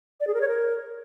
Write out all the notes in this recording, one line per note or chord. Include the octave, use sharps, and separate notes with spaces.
D5
G#4
A#4
C#5
A#4